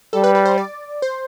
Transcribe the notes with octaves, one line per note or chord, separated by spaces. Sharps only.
G3 A4
B4
B4
C5
D5
C5